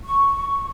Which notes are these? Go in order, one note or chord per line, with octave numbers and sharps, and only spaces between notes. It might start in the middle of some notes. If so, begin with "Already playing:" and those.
C#6